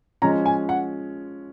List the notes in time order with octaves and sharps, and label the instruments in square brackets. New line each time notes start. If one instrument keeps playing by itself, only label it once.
[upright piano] F3 G#3 C#4 [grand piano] A#5
[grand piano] G#5
F#5